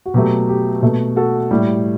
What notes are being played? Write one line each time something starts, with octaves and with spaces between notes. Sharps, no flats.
F#4
B2 F#3 A3 G4
G4
B2 A3
F#4 A4
A2 G3